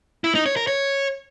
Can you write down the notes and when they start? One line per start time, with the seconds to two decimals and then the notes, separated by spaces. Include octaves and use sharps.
0.24 E4
0.35 D#4
0.46 C#5
0.57 A#4
0.67 C#5